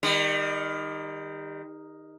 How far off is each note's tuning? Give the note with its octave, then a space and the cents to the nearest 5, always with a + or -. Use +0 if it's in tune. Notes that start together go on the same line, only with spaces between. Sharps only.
D#3 +0 G3 +35